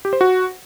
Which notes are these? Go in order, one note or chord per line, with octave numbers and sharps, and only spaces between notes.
G4
C5
F#4